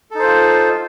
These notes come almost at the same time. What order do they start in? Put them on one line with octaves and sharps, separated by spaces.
A4 D#4 C5 F4